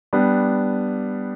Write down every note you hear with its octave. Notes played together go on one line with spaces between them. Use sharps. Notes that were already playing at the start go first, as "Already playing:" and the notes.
G3 B3 D4